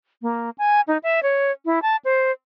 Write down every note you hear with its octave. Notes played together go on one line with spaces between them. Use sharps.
A#3
G#5
D#4
E5
C#5
E4
A5
C5